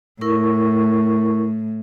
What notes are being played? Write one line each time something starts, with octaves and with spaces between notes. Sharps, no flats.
A2 E4 A#4 C#6